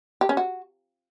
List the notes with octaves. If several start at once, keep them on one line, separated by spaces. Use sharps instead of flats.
G4
C#4
F#4